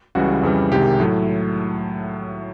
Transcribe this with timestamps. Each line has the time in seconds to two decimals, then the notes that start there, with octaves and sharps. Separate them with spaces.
0.15 C#2 C#3 E3 G3 F#4
0.43 F2 C#3 E3 G3
0.71 C2 C3 D#3 G#3 G4
1.00 A2 F#3 A3